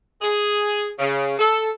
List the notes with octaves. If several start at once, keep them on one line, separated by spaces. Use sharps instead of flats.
G#4
C#3
A4